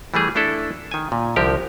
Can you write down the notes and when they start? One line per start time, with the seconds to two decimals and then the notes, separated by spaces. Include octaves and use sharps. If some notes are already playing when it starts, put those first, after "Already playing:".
0.14 E3 G3 A3 G#4
0.35 A3 D4 E4 A4
0.91 D#3 G#5
1.12 A#2
1.36 C2 D3 F3 G4 A#4